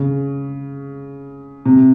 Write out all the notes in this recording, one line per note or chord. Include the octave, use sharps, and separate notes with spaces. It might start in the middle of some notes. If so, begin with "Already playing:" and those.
Already playing: C#3
C3